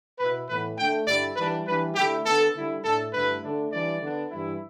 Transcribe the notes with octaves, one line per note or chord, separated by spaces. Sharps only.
B2 B3 E4 B4
A2 E3 B3 B4
D3 A3 D4 G5
G2 D3 G3 E4 D5
E3 G3 D4 B4
E3 G3 D4 B4
D3 A3 E4 G4
D3 B3 D4 A4
D3 G3 E4
A2 A3 D4 A4
G2 D3 A3 E4 B4
D3 A3 D4
E3 G3 D4 D5
D3 B3 D4
G2 E3 G3 E4